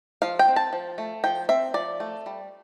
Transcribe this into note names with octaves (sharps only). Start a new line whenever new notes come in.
F3 F5
G5
C4
A5
F3
A3
F3 G5
C4 E5
F3 D5
A3
G3